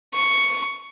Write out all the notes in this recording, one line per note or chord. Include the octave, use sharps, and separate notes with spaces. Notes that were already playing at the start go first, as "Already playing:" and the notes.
C#6